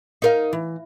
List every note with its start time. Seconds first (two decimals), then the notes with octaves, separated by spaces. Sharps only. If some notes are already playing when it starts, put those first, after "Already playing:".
0.22 D#4 A#4 F5
0.53 E3